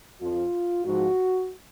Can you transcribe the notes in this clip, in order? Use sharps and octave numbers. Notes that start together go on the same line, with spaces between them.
F2 F3 F4
G#2 F3 F#4